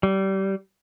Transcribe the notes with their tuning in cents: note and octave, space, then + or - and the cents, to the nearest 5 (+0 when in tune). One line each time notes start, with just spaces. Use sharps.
G3 -25